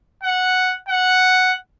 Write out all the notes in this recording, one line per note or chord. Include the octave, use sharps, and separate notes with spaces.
F#5
F#5